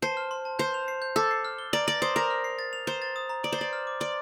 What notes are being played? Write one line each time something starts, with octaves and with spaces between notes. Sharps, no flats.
C5 A5
F6
C6
A5
C5 G6
F7
C7
G6
A4 D6
C7
F6
G7
D5 A#5
D5 A#6
C5 D#6
A#4 F7
F6
C7
A6
F7
C5 A#5
A6
D#6
A#5
D5 D6
C5
D5 A6
F6
D6
D5 C6